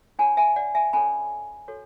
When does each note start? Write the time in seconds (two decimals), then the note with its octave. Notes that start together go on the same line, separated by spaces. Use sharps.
0.19 D4 F#4 C#5 G#5 B5
0.37 E5 G#5
0.56 D5 F#5
0.75 E5 G#5
0.93 C#4 F#4 A4 C#5 G#5 B5
1.68 F#4 A4 C#5